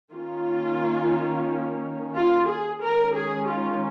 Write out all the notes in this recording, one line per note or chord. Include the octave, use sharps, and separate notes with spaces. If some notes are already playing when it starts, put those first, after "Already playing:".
D#3 A#3 C#4 F4
F4
G#4
D#3 G#3 C#4 A#4
G#4
F4